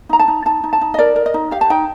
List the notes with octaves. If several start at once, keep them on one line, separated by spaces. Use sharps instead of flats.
D#4 A#5
A5
D#4
D#4 A5
D#4
A5
D#4
D#5
A#4 D5
A#4
D#5
D#4
G4 F5
A5
D#4 G5